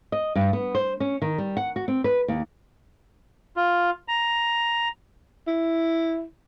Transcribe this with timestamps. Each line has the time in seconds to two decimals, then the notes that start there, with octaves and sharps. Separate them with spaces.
0.12 D#5
0.36 G2
0.53 B3
0.75 C5
1.00 C#4
1.22 D#3
1.38 G3
1.57 F#5
1.76 F#4
1.88 C4
2.04 B4
2.28 D#2
3.56 F4
4.08 A#5
5.47 E4